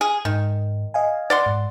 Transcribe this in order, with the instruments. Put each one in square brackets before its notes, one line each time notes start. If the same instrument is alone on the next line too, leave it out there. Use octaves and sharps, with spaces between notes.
[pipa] G#4
[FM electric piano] G#2 [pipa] D#3
[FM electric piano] D#5 F5 G#5
[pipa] D5 F#5 C6
[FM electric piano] G#2